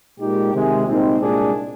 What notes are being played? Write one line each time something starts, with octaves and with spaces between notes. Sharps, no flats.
A#2 G#3 D#4 G4
C3 D#3 G#3
C2 A#2 G#3 C4 D#4
C2 A#2 G#3 D4 G#4